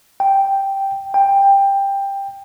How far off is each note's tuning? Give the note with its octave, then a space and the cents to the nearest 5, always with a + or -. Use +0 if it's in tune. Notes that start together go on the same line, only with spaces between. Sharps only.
G5 +0
G5 +15